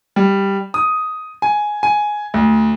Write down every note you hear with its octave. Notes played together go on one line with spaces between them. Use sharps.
G3
D#6
G#5
G#5
D2